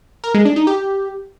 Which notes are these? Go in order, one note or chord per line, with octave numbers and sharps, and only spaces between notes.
A#4
G#3
D4
D#4
G4